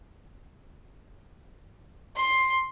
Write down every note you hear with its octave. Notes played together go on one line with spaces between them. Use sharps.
C6